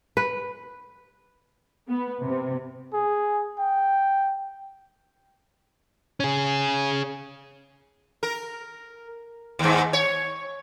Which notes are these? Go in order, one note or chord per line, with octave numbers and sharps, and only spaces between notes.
B4
B3
C3
G#4
G5
C#4 G#4
A#4
D#2 G#2
C#5